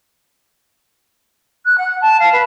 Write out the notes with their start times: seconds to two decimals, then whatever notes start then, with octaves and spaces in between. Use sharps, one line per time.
1.65 F#6
1.77 F#5
2.01 A5
2.19 F5
2.32 B4